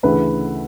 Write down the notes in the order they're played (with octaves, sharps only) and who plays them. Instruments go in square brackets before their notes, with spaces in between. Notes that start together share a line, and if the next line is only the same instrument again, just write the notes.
[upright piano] D2 C#3 E3 A3 B4